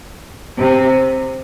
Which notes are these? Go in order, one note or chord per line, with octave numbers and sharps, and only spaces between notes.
C3